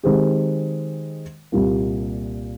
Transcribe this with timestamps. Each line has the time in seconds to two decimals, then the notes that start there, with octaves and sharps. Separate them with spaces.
0.03 D#3 G#3 C4 G4
1.52 C2 A#2 G3 A#3